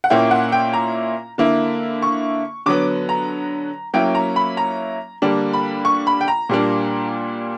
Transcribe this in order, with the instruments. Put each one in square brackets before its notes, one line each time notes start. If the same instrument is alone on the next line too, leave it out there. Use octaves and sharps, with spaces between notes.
[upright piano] F#5
A#2 A#3 C#4 E4 G5
F#5
G5
A#5
D3 A#3 E4
C#6
D3 F#3 B3 D6
A#5
F#3 A#3 C#4 E4 G5
A#5
B5
A#5
D3 G3 A#3 D4
B5
C#6
B5
G5
A#5
A#2 G3 A#3 D4